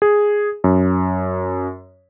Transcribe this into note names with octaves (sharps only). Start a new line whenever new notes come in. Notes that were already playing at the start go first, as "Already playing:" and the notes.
G#4
F#2